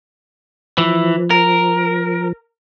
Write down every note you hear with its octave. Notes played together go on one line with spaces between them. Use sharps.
E3 F3
A#4